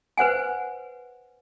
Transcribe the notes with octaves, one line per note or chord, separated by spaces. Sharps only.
B4 C5 F#5 G#5